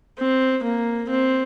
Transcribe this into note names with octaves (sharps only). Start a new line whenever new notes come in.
C4
A#3
C4